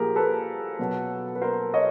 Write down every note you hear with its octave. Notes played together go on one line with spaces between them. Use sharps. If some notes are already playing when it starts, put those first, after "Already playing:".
Already playing: A#2 F3 G4 G#4 A#4
A4 B4
B2 F#3
B4
A#4 C5
C#5 D#5